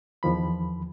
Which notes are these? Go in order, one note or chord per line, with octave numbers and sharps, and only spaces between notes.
E2 D#3 F3 B5